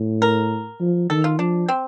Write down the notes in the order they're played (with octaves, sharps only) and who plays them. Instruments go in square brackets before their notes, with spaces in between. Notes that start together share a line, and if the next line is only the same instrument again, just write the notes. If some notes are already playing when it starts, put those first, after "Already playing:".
Already playing: [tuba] A2
[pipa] A#4
[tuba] F3
[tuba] D#3 [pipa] A4
[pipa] F4
[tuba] F3 [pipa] D4
[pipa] C4